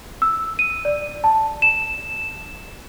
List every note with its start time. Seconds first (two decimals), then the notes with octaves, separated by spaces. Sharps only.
0.22 E6
0.59 D#7
0.85 D5
1.24 A5
1.62 E7